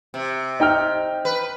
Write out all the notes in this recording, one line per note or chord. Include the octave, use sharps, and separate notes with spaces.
C3
D#4 G5 F6
B4